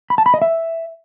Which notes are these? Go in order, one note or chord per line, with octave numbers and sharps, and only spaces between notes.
B5
A5
B5
D#5
E5